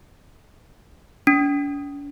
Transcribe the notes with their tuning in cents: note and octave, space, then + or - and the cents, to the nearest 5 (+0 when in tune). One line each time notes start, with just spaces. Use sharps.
D4 -45